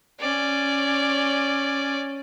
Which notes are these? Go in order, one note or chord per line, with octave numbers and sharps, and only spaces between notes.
C#4 D5